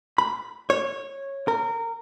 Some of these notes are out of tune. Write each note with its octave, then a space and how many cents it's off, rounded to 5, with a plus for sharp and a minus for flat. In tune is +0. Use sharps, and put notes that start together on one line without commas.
B5 -10
C#5 -15
A#4 -20